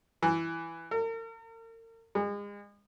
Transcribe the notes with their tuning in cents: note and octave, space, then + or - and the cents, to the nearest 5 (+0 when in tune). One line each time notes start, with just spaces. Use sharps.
E3 +5
A#4 -40
G#3 -30